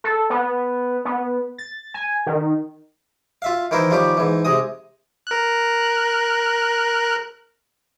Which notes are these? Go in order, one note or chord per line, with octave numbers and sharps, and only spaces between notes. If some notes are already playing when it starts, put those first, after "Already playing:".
A4
B3
B3
A6
G#5
D#3
F4 E5 F5
D#3 E3 E4 A#4 C5
D#3 F3 G3 C#4 G4
G#2 E3
C3 G#3 D#5 D#6
A#4 F#6